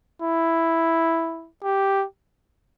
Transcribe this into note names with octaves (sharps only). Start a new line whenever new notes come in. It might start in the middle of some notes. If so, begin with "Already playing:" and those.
E4
G4